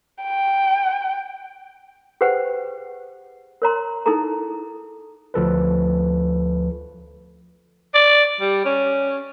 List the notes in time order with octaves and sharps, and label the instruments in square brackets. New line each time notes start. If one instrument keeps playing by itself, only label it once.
[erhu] G5
[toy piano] G4 G#4 B4 C5 F#5 G5
A#4 C#5 A#5 C6
D#4 E4 G#4 A4 A#5
[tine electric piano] D2 F3 A4 B4
[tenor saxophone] D5
G3
C#4